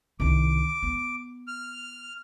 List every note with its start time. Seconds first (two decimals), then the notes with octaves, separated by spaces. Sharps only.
0.20 C2 D#3 D6
0.83 B3
1.47 F6